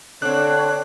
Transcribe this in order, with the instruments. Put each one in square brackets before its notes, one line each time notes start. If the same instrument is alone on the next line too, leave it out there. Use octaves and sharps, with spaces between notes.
[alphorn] D3 [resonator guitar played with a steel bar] C4 D4 [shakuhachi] C#5 [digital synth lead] F#6